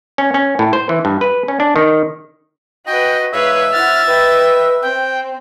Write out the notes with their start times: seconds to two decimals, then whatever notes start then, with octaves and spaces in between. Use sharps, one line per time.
0.18 C#4
0.34 C#4
0.59 A2
0.73 C5
0.89 E3
1.05 G2
1.21 B4
1.48 C#4
1.60 D4
1.76 D#3
2.87 F#4 B4 D#5 G5
3.33 G#2 B4 C#5 E5 F5
3.73 E4 C5 F#5 F6 A6
4.08 B4 D#5 G5
4.82 C4 G5